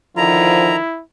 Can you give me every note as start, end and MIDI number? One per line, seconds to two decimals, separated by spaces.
0.17 0.76 50
0.17 0.76 51
0.17 0.76 53
0.17 1.01 64
0.17 0.76 82